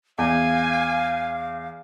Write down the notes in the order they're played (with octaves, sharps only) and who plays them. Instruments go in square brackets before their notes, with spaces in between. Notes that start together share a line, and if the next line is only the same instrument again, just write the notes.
[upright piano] E2 [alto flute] F5 [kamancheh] G#5